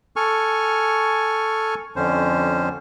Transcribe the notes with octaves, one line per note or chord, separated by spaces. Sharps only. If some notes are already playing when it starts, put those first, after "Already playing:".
A4 G#5 C#6 F6
F2 D3 C#4 C5